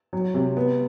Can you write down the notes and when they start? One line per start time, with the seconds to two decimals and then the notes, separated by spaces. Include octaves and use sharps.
0.13 F#3
0.34 C3
0.57 B3